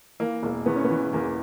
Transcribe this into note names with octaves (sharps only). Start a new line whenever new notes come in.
E3 A#3
E1 A#3
E2 B3
C#4
B3
E3
E2 A#3